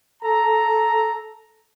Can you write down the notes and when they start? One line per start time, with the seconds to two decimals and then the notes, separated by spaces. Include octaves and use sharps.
0.23 A4 A#5